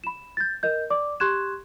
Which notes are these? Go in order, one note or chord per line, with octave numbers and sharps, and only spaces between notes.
B5 E7
G6 A6
A#4 D#5 G6
D5 D6
G4 C6 C#6 F#6 G#6 E7